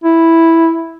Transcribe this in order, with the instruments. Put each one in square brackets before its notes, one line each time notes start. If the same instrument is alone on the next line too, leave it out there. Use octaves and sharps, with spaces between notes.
[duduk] E4